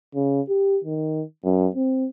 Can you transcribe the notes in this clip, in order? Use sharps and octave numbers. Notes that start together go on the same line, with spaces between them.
C#3
G4
D#3
F#2
C4